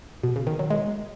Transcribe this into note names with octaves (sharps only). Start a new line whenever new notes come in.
B2
C#3
D#3
F#3
G#3